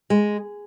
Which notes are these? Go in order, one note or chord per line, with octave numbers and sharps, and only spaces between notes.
G#3